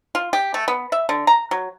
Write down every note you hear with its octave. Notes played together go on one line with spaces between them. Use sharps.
F4
G4
A3
B3
E5
D3
A#5
F#3